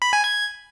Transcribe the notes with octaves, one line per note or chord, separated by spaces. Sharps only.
B5
G#5
G#6